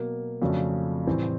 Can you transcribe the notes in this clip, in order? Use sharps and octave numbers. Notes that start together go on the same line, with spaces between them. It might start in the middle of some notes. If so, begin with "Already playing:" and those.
Already playing: B2 F#3 A#3
F2 C#3 F#3 A3 D4
A2 E3 G3 C4